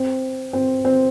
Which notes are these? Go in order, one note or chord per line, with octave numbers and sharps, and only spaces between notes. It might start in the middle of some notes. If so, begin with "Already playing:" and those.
Already playing: C4
C4
C4